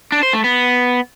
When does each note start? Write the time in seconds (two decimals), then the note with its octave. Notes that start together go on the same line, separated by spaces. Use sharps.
0.12 D4
0.23 C5
0.33 A3
0.44 B3